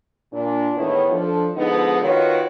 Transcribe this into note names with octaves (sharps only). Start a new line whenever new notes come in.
A#2 D4
E2 A2 D#3 B3 E4 C#5
F3 D4 A4
D3 F3 G#3 B3 D#4
D#3 F4 F#4 B4 C#5